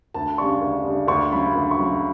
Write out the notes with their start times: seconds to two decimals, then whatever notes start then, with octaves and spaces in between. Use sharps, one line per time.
0.14 D2 A5
0.38 C#3 G3 D4 C#6
0.61 D2
0.84 C#3 G3 D4
1.08 D2 C#6
1.32 C#3 F#3 B5
1.56 D2
1.71 C#6
1.78 C#3 F#3
1.86 B5